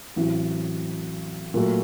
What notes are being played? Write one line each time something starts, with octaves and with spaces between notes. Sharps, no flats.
A1 A2 F#3 C4
A#2 F#3 A3